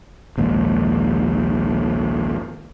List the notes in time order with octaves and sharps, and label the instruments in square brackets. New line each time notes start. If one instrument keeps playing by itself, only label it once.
[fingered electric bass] A#1 D#2 G#2